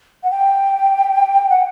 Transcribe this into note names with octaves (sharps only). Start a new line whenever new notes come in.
F#5
G5
F#5